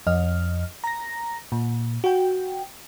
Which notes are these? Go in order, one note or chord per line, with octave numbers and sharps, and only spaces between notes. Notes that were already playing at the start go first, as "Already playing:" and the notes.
F2 D#5 F6
A#5 A#6
A#2
F#4 G5